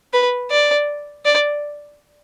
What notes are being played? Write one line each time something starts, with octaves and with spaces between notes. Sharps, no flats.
B4
D5
D5